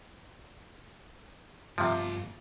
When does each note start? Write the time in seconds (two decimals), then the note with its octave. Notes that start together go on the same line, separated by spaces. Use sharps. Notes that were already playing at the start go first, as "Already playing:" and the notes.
1.78 G2 C3 F3 A3 F4 E5 F5